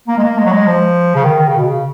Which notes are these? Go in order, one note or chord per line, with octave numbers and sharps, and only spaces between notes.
A#3
G#3
A#3
G#3
F#3
G#3
F3
C#3
D#3
D#3
C#3
B2
C#3